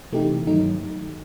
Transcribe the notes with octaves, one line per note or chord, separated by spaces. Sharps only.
C3 E3 A3 D#4 G4
G2 D#3 F#3 A3 D#4